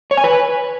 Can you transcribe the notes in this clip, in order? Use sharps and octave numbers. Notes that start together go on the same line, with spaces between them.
C#5
G#5
B4